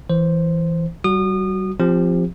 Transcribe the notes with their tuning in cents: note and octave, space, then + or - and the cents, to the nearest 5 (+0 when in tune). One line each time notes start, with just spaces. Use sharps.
E3 +0 C5 +0
G3 -35 F#4 +0 D#6 -30
F3 +0 C4 +0 G4 +25